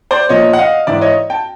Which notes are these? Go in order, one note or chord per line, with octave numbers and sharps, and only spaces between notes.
C5 D5
A#2 F3 C#5 D#5
F#5
D#5 F5
G#2 E3 D5 E5
C#5 D#5
G5 A5